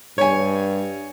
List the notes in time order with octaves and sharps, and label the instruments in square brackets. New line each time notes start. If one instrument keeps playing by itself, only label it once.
[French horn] G2 [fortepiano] C#5 G#5